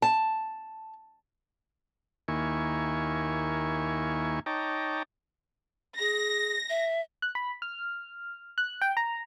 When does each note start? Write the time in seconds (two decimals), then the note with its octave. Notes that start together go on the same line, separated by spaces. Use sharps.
0.02 A5
2.28 D#2 A#3 E4 G#5 C#6
4.46 D#4 C#5 G5 A5 A#5 D6
5.99 G#4 A#6
6.70 E5
7.22 F#6
7.35 B5
7.62 F6
8.58 F#6
8.82 G5
8.97 A#5